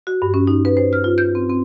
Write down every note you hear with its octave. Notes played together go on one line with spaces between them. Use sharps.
F#4
G2
C#4
D#4
B4
C5
F6
F4
G6
C4
C4